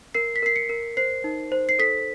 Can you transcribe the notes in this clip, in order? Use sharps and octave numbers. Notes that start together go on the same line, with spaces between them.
A#4 C7
B6
A#4 C7
C#7
A#4
C5 C7
D#4
C5
C7
A4 B6